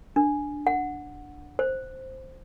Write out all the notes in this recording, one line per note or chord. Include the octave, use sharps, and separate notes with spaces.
D4
F#5
C5